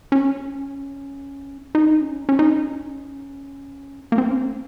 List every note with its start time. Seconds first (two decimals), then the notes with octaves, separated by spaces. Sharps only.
0.12 C#4
1.75 D#4
2.01 C#4
2.29 C#4
2.39 D#4
2.50 C#4
4.12 A#3
4.18 C4
4.30 C#4
4.38 C4